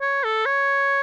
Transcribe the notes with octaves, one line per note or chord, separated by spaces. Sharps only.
C#5
A4
C#5